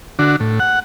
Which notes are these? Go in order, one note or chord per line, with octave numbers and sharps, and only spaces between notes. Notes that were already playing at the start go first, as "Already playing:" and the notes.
D3 D4 F#4
A2
F#5